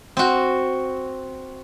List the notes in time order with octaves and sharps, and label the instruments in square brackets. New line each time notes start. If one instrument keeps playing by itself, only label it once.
[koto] C4 F#4